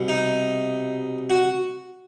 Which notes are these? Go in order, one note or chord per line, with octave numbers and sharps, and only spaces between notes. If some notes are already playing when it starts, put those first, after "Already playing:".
Already playing: C2 B2
D#4
F#4